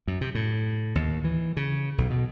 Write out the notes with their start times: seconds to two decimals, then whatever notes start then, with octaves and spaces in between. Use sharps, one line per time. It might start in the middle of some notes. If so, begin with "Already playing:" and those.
0.07 F#2
0.21 C3
0.35 A2
0.95 D#2
1.24 E3
1.57 C#3
1.98 B1
2.10 B2